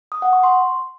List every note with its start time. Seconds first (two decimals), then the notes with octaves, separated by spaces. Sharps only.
0.12 D#6
0.22 F#5
0.33 C#6
0.43 C6